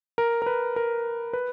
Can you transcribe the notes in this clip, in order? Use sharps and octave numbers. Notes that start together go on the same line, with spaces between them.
A#4
A#4
B4
A#4
B4